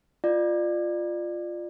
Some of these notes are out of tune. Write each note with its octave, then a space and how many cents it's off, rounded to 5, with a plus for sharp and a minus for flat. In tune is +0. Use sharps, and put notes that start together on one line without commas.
F4 +0 D5 +30